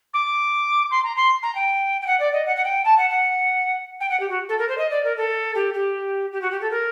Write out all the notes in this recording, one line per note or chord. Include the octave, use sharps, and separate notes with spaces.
D6
C6
A#5
C6
A#5
G5
G5
F#5
D5
D#5
F#5
F#5
G5
A5
F#5
F#5
G5
F#5
G4
F#4
A4
A#4
C5
D#5
D5
A#4
A4
G4
G4
G4
F#4
G4
A4
A#4